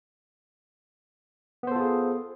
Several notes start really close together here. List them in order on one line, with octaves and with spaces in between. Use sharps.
B3 C5 A4 F4 G#4